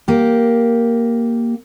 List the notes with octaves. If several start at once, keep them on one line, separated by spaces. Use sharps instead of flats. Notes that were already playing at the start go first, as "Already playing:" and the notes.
A#3 G4